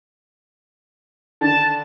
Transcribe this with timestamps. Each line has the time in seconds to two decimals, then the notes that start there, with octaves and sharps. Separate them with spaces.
1.41 D3 D#3 D4 A5